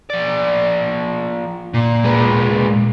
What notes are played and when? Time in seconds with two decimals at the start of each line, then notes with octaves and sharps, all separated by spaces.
0.10 F3 D5
1.74 A#2
2.04 G#3 B4